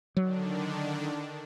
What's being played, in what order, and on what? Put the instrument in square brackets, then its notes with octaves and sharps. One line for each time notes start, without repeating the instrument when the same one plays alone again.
[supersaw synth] D3 D#3 D4 [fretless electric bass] F#3